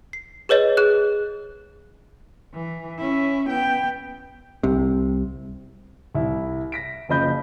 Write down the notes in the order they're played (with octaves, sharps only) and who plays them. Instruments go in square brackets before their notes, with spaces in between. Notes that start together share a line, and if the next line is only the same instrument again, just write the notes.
[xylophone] C7
G#4 B4 C#5 D#5
G#4 F#6
[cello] E3
C#4 E4
B3 G5
[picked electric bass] C2 C3
[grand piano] C2 E4
A#6 B6 D7
F#1 F3 C#4 D#5 B5 G6